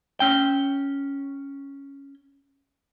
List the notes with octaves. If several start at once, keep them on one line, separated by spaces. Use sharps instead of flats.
C#4 G5